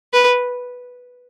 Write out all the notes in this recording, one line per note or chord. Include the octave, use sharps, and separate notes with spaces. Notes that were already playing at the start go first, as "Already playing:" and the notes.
B4